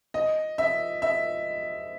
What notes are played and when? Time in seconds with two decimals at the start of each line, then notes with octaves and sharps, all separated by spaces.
0.14 D#5
0.58 E5
1.02 E5